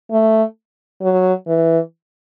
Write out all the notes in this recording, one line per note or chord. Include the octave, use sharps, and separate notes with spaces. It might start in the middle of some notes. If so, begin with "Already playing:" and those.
A3
F#3
E3